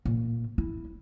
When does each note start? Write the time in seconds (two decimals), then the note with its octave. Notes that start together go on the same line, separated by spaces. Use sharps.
0.05 A#2
0.58 E4